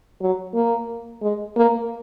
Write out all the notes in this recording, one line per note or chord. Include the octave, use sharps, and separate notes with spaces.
F#3
A#3
G#3
A#3